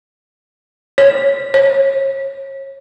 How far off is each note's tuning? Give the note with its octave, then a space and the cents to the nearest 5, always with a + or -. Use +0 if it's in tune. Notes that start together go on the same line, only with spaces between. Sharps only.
C#5 -5
C#5 -30